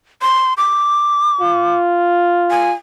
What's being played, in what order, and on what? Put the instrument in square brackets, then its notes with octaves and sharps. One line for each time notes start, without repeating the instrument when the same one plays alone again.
[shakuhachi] C6
D6
[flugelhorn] F4
[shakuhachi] G#5